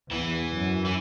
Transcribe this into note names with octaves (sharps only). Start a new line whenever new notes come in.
E2 E3
F#2
E3